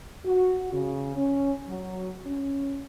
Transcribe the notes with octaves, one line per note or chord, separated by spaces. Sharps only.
F#4
C#3
C#4
F#3
C#4